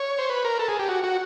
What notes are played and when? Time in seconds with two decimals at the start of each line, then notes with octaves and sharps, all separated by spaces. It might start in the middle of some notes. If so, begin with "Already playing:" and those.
Already playing: C#5
0.19 C5
0.30 B4
0.45 A#4
0.59 A4
0.68 G#4
0.79 G4
0.89 F#4
1.04 F#4